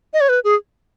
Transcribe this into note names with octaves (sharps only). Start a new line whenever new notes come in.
D#5
C#5
B4
G#4